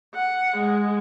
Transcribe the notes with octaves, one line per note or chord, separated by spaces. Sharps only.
F#5
G#3